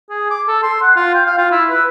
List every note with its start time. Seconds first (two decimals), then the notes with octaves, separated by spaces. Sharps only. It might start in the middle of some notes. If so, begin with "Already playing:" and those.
0.10 G#4
0.30 D6
0.48 A4
0.63 C6
0.82 F#5
0.96 F4
1.15 G5
1.26 F5
1.38 F4
1.52 E4
1.70 B4